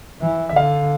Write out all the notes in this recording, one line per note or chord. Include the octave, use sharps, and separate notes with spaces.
E3
E5
D3 F5